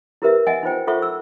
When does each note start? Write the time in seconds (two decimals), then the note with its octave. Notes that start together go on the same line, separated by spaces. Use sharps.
0.22 E4 G4 A#4 B4 E5
0.47 D#5 E5 F#5 G#5
0.63 D#4 F4 C5 G5
0.87 F4 A4 C5 E5 F#5 C#6
1.02 E6